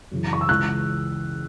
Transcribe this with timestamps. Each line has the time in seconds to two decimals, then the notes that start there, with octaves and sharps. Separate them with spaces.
0.11 F#2 C#3 E3
0.33 C#6
0.41 E6
0.49 C#2 C#3 E3 F#6